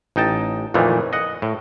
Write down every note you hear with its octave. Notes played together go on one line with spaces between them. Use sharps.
A1 D#4 G5 A5
F2 A#2 D#3 E3 A3
D#5 F#5
A2